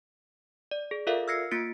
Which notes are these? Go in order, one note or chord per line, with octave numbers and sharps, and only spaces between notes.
D5
G#4
F4 A4 A#4 D5 E5 F5
E6 F6 G#6 A#6 C7 C#7
A#3 F4 A6 B6 C#7 D7